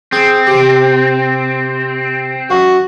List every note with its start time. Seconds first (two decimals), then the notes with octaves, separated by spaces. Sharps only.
0.12 C4 G#4
0.47 C3 G4
2.50 F#2 F#4